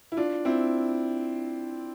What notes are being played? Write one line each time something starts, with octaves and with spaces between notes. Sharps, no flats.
E4
D4 F4
C4 E4